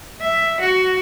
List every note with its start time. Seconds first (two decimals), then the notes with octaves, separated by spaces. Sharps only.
0.21 E5
0.60 F#4